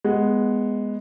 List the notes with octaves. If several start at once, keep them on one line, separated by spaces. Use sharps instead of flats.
G#3 B3